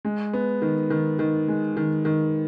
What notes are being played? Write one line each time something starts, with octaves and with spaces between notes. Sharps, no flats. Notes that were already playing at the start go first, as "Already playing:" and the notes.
G#3
B3
D#3
D#3
D#3
G#3
D#3
D#3